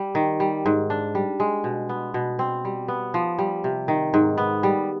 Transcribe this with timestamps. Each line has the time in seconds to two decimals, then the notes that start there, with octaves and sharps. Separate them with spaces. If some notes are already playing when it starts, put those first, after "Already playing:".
Already playing: G3
0.15 D#3
0.40 G3
0.66 G#2
0.90 D4
1.15 G3
1.40 G#3
1.64 B2
1.89 B3
2.14 B2
2.39 C4
2.65 G3
2.88 B3
3.14 F3
3.39 G3
3.64 C3
3.88 D#3
4.14 G#2
4.38 B3
4.63 G3